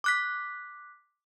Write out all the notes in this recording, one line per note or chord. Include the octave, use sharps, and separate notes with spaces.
D6 F#6 B6